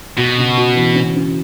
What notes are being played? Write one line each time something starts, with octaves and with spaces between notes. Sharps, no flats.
B2 F#4
C#3
F#4
E3
C#4
C#4